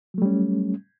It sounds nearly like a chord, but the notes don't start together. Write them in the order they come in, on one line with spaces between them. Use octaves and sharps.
F#3 A3 G3 C#4